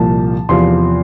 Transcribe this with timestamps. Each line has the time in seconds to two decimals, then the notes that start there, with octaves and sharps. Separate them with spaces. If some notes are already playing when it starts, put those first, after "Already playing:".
Already playing: C2 A#2 F3 A5
0.49 E2 C3 F3 C6